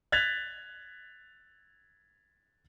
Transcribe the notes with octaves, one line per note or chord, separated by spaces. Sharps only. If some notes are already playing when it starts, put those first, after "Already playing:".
F#6 G#6 A6 B6 F7